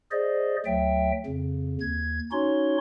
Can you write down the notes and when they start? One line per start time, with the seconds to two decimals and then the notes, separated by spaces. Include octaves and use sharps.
0.11 G#4 C5 D5 D#5
0.66 D2 F#3 E5 G5
1.26 F2 C#3
1.81 D#2 G#6
2.32 C#4 D#4 F#4 C#5 C6